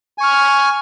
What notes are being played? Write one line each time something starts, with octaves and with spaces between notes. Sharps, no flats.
G#5 C#6 F6